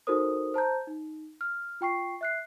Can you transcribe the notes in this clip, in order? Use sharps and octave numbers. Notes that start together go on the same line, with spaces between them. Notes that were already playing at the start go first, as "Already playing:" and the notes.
D#4 F#4 A4 A#4 C5 D#6
C5 A5 A#5 G6
D#4
F6
F4 G5 C#6 C7
E5 F#6 C7